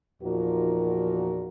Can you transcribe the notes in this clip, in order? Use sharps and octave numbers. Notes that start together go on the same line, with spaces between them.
E2 A#2 F3 D#4 F#4 A#4